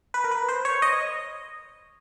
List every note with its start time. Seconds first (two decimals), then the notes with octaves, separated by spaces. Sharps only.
0.14 B4
0.24 A#4
0.31 B4
0.49 C5
0.65 C#5
0.82 D#5